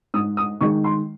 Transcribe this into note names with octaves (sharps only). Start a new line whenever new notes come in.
G#2 D#6
D#6
D#3 G#3 C#6
C6